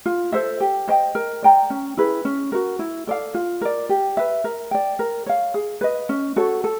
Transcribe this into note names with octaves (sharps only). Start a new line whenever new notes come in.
F4
A4 C5 E5
G4
C5 D#5 G5
A#4
D5 G5 A#5
C#4
E4 G#4 B4
C#4
F#4 A#4
E4
A4 D5 F5
F4
A#4 D5
G4
B4 E5
A#4
D5 G5
A#4
C#5 F5
G#4
B4 D#5
C#4
F#4 A4 C#5
A4